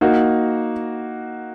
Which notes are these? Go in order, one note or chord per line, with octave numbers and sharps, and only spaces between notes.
A#3 D#4 F#4